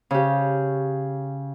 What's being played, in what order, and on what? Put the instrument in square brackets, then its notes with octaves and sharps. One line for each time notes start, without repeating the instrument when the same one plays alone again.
[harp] C#3 G4